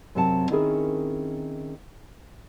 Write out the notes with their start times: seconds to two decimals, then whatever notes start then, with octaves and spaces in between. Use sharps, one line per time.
0.15 F#2 C3 F#3 C4 F#5 A5
0.50 D#3 C4 C#4 E4 G#4 A#4